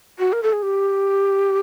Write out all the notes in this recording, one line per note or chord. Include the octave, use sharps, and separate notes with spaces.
F#4
A#4
A4
G#4
G4